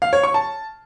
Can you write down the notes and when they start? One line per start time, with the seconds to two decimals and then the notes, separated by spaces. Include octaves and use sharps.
0.02 F5
0.13 C#5
0.24 C#6
0.34 A5